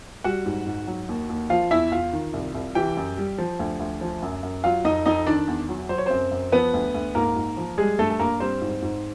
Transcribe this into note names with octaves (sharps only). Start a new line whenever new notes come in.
G3 F#4 F#5
G#2
G#2
F#3
D#2
D#2
F3 F4 F5
E2 E4 E5
E2 F4 F5
D#3
C2
C2
E3 G4 G5
F#2
G3
F3
D2
D2
F3
F#2
F#2
F#3 F4 F5
F2 D#4 D#5
F2 D#4 D#5
D#3 D4 D5
E2
F#3
F#3 C5
C#5
F#2 C4 C5
F#2
F3 B3 B4
D2
D2
G#2 A#3 A#4
G#2
F3
G3 G#3 G#4
G2 A3 A4
A4
G2 A#3 A#4
G3 C4 C5
G#2
G#2